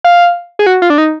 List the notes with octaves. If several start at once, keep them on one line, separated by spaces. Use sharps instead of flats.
F5
G#4
F#4
F4
D4
D#4